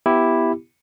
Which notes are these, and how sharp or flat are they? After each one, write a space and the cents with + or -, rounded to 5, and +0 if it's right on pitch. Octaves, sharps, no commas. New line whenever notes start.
B3 +0 E4 +0 G4 +0